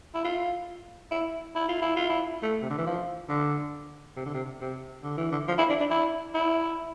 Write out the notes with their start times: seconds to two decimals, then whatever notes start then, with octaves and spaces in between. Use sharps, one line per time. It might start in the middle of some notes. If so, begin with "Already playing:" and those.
0.15 E4
0.24 F4
1.11 E4
1.55 E4
1.68 F4
1.82 E4
1.96 F4
2.09 E4
2.42 A3
2.62 C3
2.70 D3
2.78 E3
2.86 F3
3.29 D3
4.17 C3
4.25 D3
4.34 C3
4.61 C3
5.03 D3
5.17 E3
5.32 D3
5.48 F3
5.58 E4
5.69 D4
5.80 D4
5.91 E4
6.34 E4